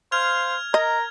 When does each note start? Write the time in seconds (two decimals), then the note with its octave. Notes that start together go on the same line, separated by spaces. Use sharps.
0.12 C5 F5 F6 G#6 F7
0.74 A#4 D#5 A#5